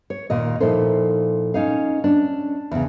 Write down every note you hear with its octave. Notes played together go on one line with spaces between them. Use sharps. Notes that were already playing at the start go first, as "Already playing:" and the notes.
C#5
D#2 A#2 D#3 D#5
A#2 F3 D#4 E4 A4 C5
C#4 D#4 F5
C#4 D4
E2 C#3